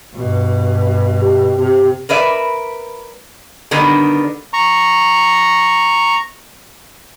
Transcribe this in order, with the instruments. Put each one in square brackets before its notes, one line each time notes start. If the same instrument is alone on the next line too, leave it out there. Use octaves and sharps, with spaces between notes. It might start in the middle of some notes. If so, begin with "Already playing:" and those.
[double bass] G2 B2
[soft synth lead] G4
[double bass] C3
[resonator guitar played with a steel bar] A#4 B4 D5 E5
D3 D#3 G3 B3
[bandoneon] A#5 C#6